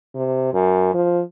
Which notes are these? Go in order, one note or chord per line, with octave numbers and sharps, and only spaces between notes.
C3
F#2
F3